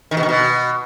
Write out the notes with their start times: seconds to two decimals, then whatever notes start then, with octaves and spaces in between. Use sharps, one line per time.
0.11 D#3
0.17 B2
0.23 D#3
0.29 B2